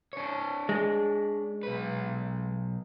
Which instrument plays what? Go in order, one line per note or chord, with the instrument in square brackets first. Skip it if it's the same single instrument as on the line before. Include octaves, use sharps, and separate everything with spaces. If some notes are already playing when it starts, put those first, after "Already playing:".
[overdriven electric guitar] D4 C#5
[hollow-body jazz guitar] G#3
[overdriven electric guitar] B1 B4